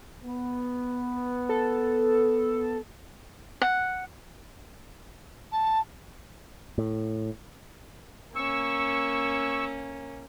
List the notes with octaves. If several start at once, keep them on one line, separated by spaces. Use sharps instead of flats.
B3
A4
F#5
A5
A2
A#3 C#4 C#6 E6